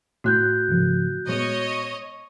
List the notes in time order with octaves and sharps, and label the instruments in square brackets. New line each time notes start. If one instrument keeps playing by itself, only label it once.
[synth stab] A2 [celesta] F#4 F#6 G6
[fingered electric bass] G#2 C#3 F3
[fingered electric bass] A#2 G#3 B3 [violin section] C#5 D#5